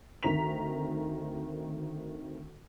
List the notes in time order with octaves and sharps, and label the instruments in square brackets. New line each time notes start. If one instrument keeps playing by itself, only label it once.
[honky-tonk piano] D2 D#3 C4 A#5 B6 F7